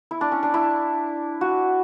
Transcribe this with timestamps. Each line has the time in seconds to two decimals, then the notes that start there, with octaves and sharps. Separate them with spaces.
0.11 E4
0.21 D4
0.32 C#4
0.43 D4
0.54 E4
1.41 F#4